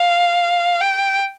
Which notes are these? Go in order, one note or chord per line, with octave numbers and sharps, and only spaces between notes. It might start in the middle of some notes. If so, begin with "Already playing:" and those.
Already playing: F5
G5